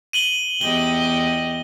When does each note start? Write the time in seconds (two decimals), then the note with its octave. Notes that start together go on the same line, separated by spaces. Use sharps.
0.13 D#7 F#7 G7
0.61 E2 G4 D#5 G7